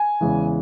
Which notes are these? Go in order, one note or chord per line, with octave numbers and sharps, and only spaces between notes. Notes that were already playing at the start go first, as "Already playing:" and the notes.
Already playing: G#5
E2 C#3 E3 G#3